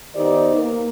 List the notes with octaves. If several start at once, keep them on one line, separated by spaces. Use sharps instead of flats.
D#3 B3 D#4 G4 C5 D5
A#3